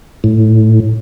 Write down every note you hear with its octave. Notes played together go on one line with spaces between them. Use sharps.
A2